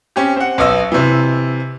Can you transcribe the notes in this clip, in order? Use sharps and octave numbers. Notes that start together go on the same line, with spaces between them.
C4 C#4 G4
C4 F#5
B1 B3 D#5 E6
C3 E3